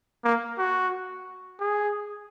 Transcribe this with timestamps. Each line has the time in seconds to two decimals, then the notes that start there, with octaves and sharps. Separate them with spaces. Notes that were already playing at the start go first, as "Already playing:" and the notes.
0.24 A#3
0.58 F#4
1.60 G#4